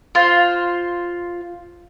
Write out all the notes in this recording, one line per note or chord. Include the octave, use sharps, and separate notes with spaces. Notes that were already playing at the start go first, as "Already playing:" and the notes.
F4 C5